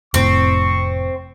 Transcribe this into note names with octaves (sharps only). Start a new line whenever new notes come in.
F1 A2 C4 C#6